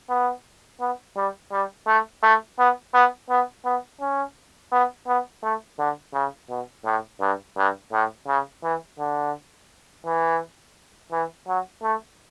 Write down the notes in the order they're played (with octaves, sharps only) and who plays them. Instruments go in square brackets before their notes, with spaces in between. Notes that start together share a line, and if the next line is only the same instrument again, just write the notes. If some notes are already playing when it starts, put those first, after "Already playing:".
[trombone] B3
B3
G3
G3
A3
A3
B3
B3
B3
B3
C#4
B3
B3
A3
D3
C#3
B2
A2
G2
G2
A2
C#3
E3
D3
E3
E3
F#3
A3